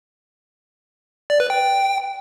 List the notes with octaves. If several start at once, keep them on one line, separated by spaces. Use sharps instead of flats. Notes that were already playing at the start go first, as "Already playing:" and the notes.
D5
B4
G5